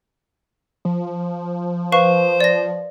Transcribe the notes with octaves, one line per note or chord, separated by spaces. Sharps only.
F3
B4 C5 F5 C#6
D5 A#6